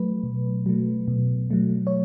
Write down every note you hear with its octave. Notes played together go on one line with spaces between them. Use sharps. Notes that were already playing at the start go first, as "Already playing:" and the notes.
Already playing: F#3 A3 B4
B2
F#3 A3
B2
F#3 A3
C#5